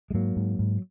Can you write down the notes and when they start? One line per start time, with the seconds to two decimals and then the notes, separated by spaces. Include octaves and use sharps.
0.11 G#3
0.14 G#2 F#3 A#3
0.36 G#2
0.59 G#2